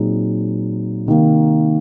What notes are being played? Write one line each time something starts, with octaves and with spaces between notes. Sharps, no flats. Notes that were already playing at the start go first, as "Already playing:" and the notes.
Already playing: A#2 F#3 C4 D#4 G#4
C3 D#3 A#3